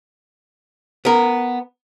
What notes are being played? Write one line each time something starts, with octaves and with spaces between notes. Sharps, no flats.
B3 A#4